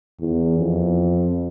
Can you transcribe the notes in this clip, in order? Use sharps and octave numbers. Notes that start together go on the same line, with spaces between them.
E2
F2